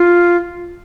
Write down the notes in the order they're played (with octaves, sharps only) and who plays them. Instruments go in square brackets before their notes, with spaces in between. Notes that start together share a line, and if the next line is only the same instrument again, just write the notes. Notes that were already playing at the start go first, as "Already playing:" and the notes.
Already playing: [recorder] F4